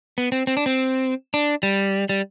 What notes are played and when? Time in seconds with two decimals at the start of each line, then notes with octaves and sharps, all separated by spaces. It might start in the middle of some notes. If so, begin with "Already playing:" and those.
0.18 B3
0.32 C4
0.47 C4
0.57 D4
0.66 C4
1.34 D4
1.63 G3
2.09 G3